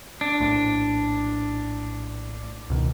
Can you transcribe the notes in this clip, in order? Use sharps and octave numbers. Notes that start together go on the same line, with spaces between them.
D4
A#1 A2
C#2 B2 D#3